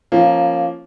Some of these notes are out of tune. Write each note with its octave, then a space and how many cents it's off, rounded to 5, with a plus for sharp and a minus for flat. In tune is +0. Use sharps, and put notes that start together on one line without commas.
F3 -10 A#3 +0 C#4 -25